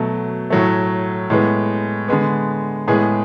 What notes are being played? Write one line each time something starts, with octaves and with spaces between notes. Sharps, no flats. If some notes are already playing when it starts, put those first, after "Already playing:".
Already playing: B2 F#3 A3
A2 F#3 A3
A2 G#3 B3
D3 G#3 B3
A2 G#3 B3 G#4